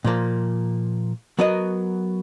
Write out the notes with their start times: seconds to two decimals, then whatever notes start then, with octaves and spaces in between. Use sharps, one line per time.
0.05 A#2 F3 A#3
1.39 F#3 B3 F#4 A#4 D#5